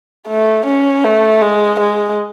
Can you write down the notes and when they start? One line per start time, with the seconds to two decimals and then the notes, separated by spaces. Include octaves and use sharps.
0.28 A3
0.66 C#4
1.04 A3
1.42 G#3
1.80 G#3